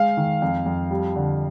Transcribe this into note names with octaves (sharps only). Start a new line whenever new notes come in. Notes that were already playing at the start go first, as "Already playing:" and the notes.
Already playing: G#3 F5
D#3
F2
F2
G3
D3